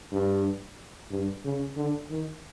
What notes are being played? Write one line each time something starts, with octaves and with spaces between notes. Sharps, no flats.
G2
G2
C#3
D3
D#3